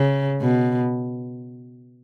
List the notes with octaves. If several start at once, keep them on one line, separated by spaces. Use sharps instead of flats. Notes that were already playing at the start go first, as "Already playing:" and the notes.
Already playing: C#3
B2